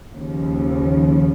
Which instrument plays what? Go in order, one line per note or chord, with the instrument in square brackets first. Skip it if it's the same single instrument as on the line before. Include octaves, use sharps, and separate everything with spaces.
[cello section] D#2 C#3 F3